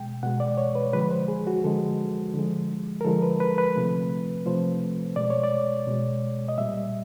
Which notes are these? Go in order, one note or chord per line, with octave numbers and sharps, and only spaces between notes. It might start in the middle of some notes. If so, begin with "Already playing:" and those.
Already playing: B2 G#3 G5
B2 G#3 F#5
D5
C#5
B4
D3 F3 G#3 B4
C5
G#4
F#4
D3 F3 G#3 A4
D3 F3 G#3
A#4
D3 F3 G#3 A4
B4
B4
B4
C3 F3 A3
C3 F3 A3 C5
B2 G#3 D5
C#5
D5
B2 G#3
D#5
A#2 G3 E5